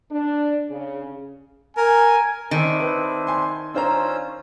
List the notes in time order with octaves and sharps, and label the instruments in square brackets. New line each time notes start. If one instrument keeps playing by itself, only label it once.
[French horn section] D4
C#3
[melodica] A#4 [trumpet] G#5
[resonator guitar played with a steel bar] D#3 [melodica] C4 D4 E4
[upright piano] B4
G#5 C6
[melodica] C#4 F4 E6 [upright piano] D4 C5 A#5